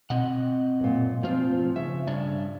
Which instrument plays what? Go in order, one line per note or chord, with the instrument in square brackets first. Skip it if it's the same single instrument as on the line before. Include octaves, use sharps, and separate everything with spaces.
[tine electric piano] B2 [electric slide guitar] C4 D#5 F#5
[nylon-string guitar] F#2 A#2
[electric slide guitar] A2 F4 [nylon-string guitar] F3 C4
[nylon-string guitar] C#3 [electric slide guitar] E5
[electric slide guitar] G2 D4 C#5